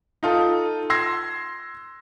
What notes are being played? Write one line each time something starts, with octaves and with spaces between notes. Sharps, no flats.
D#4 F4 A4
C6 E6 G#6 A#6 C7